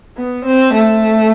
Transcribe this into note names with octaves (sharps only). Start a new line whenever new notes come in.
B3
C4
A3